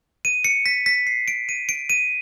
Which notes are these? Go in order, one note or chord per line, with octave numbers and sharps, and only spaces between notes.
D#7
C#7
B6
B6
C7
D7
D#7
D7
D#7